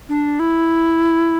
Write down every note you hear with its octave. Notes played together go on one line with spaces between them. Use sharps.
D4
E4